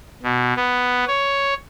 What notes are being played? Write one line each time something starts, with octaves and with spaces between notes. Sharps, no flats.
B2
B3
C#5